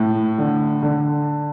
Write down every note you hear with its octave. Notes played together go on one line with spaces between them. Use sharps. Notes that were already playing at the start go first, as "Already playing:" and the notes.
Already playing: A2
D3
D3